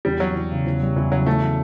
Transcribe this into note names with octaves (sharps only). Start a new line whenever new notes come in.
E2 G3
F#3 G3
E2
C#3
E2
G3
E2 E3
C#3 F#3
E2 A3
F#3